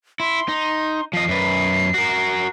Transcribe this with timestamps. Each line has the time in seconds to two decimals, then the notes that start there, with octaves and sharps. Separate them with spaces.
0.20 E4 C6
0.48 D#4
1.13 F3 D#5 C7
1.28 F#2 B4
1.94 F#4 A#4